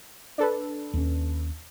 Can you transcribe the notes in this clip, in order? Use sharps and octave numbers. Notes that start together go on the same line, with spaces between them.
D4 A4 B4
D#2 C#4